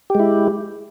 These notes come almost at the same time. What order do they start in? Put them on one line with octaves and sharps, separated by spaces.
G4 G#3 E4